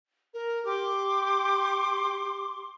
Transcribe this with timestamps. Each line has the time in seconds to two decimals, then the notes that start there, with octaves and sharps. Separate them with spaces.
0.34 A#4
0.65 G4 C6 D6